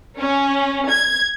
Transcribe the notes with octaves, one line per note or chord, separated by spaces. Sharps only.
C#4
G#6